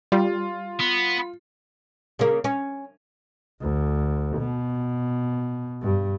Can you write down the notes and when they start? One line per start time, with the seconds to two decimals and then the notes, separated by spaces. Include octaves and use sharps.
0.12 G3 F4
0.80 B3
2.19 C#3 A#3
2.44 C#4
3.61 D2
4.37 B2
5.82 G2